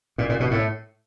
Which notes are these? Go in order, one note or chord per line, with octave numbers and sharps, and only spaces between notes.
A#2
A#2
B2
A2